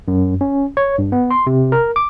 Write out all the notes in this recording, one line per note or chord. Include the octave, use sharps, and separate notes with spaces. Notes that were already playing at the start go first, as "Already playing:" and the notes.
F#2
C#4
C#5
G2
B3
C6
C3
A#4
D6